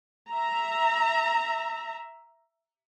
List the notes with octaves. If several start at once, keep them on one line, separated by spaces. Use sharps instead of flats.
E5 A#5